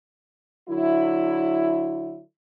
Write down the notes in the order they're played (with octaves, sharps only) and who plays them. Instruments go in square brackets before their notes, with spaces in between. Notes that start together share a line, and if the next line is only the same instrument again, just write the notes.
[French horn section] D3 F#3 E4